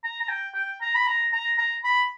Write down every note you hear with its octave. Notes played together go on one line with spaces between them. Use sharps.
A#5
A#5
G5
G5
A#5
B5
A#5
A#5
A#5
B5